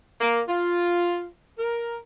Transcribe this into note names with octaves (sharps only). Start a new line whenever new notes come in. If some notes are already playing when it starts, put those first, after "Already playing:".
A#3
F4
A#4